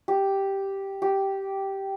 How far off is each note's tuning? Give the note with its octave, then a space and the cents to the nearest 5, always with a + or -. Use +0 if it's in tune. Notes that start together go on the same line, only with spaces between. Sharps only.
G4 -5
G4 -10